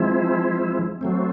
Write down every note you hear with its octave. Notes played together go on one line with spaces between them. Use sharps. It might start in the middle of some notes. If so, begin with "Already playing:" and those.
Already playing: F3 G#3 C4 E4
F#3 A3 C4